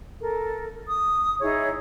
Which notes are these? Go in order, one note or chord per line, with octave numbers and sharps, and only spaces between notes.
A4 A#4
D#6
D#4 E4 G#4 C#5